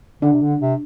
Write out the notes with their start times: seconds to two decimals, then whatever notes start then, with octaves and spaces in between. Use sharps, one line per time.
0.22 D3 D4
0.33 C3
0.41 D3
0.61 C3